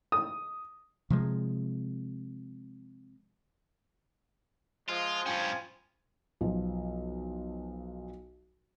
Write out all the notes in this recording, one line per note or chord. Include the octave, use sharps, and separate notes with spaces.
D#6
C3 F3 G#3
F3 G#3 F4
G2 F3 C#4 G5 G#5
B1 F3